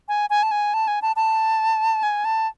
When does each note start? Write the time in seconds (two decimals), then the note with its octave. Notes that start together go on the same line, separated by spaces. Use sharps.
0.08 G#5
0.30 G#5
0.43 A5
0.51 G#5
0.74 A5
0.88 G#5
1.02 A5
1.16 A5
2.03 G#5
2.25 A5